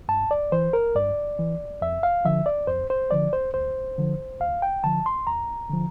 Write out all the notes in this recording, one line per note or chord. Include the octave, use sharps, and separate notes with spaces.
G2 A5
D5
E3 C5
A#4
G2 D5
E3
F2 E5
F5
D3 F3 E5
D5
F2 C5
C5
D3 F3 D5
C5
D2 C5
D3 F3
D2 F5
G5
D3 F3 A5
C6
E2 A#5
D3 F3